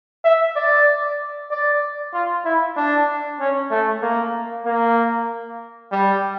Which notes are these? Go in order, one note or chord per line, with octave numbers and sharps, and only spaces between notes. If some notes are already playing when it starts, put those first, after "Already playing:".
E5
D5
D5
F4
E4
D4
C#4
A3
A#3
A#3
G3